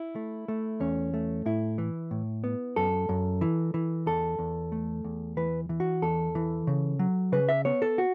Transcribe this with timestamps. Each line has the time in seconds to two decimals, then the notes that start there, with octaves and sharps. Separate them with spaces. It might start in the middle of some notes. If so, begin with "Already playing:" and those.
Already playing: E4
0.16 A3
0.48 A3
0.80 E2 C#4
1.14 A3
1.46 A2 E4
1.78 E3
2.11 A2
2.44 B3
2.76 F#2 A4
3.09 F#2
3.41 E3
3.74 E3
4.06 E2 A4
4.39 E2
4.72 A3
5.04 E2
5.37 E3 B4
5.69 E3
5.80 F#4
6.02 E2 A4
6.35 E3
6.67 C#3
6.99 F#3
7.32 C#3 B4
7.49 E5
7.65 B3 C#5
7.82 A4
7.98 F#4